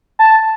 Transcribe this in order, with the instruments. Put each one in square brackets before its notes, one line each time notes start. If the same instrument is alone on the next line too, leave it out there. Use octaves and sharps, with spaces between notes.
[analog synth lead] A5